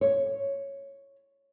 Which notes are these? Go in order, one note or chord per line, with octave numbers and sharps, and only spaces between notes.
C#5